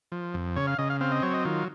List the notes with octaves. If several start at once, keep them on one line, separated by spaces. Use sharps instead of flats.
F3
F2
C#3 C#5
F5
C#3 D#5
F5
C4 F5
D#5
F#3 C#5
D#5
D#3 F4